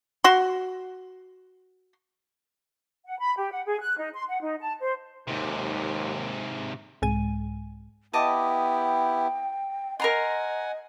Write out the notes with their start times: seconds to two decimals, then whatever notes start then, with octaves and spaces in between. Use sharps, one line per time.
0.24 F#4 C6
3.06 F#5
3.19 B5
3.37 G4
3.51 F#5
3.65 G#4
3.81 F#6
3.98 D#4
4.14 C6
4.28 F#5
4.42 D#4
4.61 A5
4.81 C5
5.28 D#2 G#2 C3
7.02 C2 G#2 G#3 G#5 D#7
8.13 B3 E4 G4 D#5 G5 A5 D6
10.00 A#4 D#5 F#5 G#5 A#5 C6